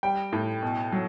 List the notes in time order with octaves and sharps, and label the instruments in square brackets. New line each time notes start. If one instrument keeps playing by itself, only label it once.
[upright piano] G3 G5
A2
B2
F#3